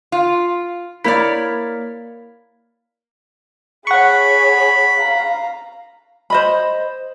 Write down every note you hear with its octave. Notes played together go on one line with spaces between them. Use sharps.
F4
A#3 E4 A#4 C#5 D5 B6
G#4 C#5 F#5 B5 C#6
F5 A#5
C5 D#5 B5